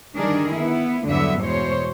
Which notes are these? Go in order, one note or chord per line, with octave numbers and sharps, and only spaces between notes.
D3 D#3 G3 D4 G#4 A#4
B3 E4
E2 G2 D3 F#3 B3 E5
E2 B2 G#3 C5 C#5